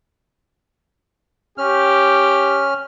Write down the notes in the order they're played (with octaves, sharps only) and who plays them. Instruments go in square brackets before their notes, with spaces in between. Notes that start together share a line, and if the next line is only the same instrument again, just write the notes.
[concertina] C#4 F6 [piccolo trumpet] G4